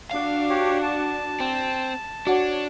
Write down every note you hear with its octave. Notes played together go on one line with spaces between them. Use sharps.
D4 F#4 F5
G4 C#5
A5
C4
D4 F#4 C#5 F#5